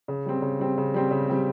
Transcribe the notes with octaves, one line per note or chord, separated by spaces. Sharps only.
C#3
G3 C4
C#3
G3 C4
C#3
G3 C4
C#3
G3 C4